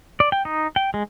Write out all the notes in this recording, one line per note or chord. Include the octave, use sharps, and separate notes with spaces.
D5
G5
D#4
G5
G#3